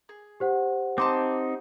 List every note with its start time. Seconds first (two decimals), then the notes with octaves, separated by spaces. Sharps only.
0.09 G#4
0.40 G4 C5 F#5
0.98 C4 D#4 A5 C6 D6